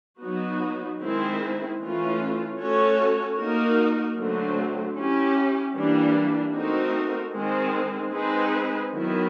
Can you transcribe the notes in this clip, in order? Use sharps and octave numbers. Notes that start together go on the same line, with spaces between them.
F#3 B3 D#4 F#4
D#3 G#3 C4 E4
E3 A3 C#4 F4
A3 C#4 F#4 A4 C#5
A#3 D#4 F#4 A#4
D3 F#3 A3 C4
C#4 E4 G4
E3 G3 A#3 D4
A3 C4 D#4 F#4 A#4
D#3 G#3 C4
G#3 C4 D#4 G#4 B4
D#3 F#3 B3 E4